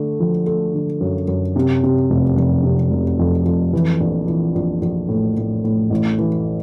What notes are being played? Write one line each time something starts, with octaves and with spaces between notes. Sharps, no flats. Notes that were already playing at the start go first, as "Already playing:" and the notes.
Already playing: D3 A3
F3
A3
D3
F#2
F#2
C3
C3
F1
F1
C3
F1
F2
F2
E3
A#1
E3
A#1
A#1
A2
A2
A2
A1
E3